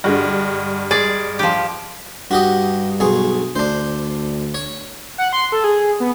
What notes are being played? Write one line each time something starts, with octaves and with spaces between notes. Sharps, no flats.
G2 D3 G#3 F#4
G#3 G#4 D5
F3 G4
G2 F#4 G4 D#5
B1 G#4 C#6
D2 D4 C5
C#5
F#5
C6
A4
G#4
B3